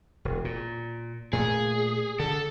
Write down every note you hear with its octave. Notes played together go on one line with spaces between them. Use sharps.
E1
A#2
A#2 A3 G#4
D3 A4